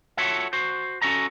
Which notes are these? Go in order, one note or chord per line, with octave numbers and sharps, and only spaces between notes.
F4 F#4 A4 C#5 E5
F#4 C5
C#4 F#4 A4 D#5 A#5